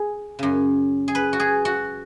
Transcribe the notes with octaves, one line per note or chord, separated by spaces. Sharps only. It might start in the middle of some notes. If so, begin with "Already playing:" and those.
Already playing: G#4
F#2 C#3
G#4
B4
F#4
G#4
F#4